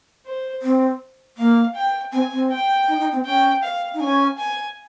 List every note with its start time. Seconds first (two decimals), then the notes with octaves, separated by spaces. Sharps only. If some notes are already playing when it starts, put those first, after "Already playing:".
0.26 C5
0.62 C4
1.37 A#3 F5
1.75 G5
2.12 C4 G#5
2.31 C4
2.50 G5
2.88 D#4
3.00 D#4
3.12 C4
3.25 C#4 G5
3.63 F5
3.94 D#4
4.00 C#4 G#5
4.38 G#5